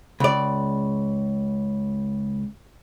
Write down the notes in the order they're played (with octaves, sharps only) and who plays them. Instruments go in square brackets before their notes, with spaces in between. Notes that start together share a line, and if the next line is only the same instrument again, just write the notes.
[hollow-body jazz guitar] C#2 D5